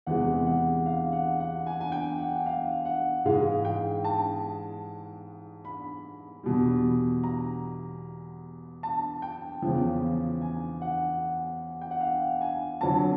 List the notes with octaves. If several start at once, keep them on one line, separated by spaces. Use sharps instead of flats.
E2 C3 E3 G#3 F#5
F#5
F5
F#5
F#5
G#5
G#5
G5
F#5
F5
F#5
G#2 E3 G#3 F5
G5
A5
B5
E2 B2 G3
A#5
A5
G5
E2 C#3 F3
G#5
F#5
G5
F#5
F5
G#5
F2 D3 F#3 A5